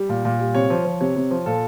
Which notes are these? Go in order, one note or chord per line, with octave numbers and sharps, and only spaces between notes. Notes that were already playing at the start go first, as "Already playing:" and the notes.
Already playing: G3
A#2
A#2
G3
C3 C#5
F3
F3
C3 C#5
C3
F3
A#2 A4